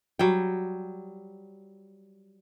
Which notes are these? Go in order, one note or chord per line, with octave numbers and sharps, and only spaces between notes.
F#3 G3 G5